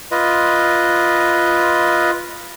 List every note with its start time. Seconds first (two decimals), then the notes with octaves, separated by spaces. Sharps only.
0.11 F4 B4 D#5